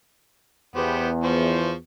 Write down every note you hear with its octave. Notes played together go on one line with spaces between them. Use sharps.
E2 B3 G4 C5
F3 C5 C#6